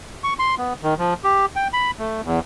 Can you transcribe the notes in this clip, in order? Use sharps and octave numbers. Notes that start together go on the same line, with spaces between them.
C#6
C6
B3
D#3
F3
G4
G5
B5
A3
E2